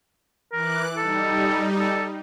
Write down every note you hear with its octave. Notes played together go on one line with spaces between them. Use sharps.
E3 A#4 D6 F#6
G3 D#4 A4
A4